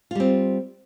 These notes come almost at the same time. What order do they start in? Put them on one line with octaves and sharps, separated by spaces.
F4 G3 C4